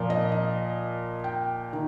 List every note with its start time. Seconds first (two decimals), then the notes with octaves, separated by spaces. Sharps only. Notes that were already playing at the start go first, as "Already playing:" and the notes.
Already playing: A#2 F3
0.10 D#5
0.32 D#5
1.24 G5
1.73 D#3